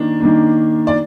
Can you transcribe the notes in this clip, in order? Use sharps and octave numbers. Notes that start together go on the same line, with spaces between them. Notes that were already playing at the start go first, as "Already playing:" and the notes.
Already playing: D#3 A#3 D4
D#3 A#3 D4
D5